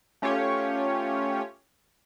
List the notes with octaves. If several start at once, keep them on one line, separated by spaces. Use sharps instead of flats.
A3 C#4 F4 G4 C#5